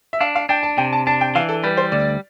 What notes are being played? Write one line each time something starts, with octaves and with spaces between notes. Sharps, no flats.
E5
D4 F5
F5
D4 G5
A5
C3 G5
A5
D4 A5
G5
E3 F5
A4
G3 B4
C5
D2 D5